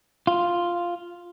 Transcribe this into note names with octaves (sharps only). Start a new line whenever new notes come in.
F4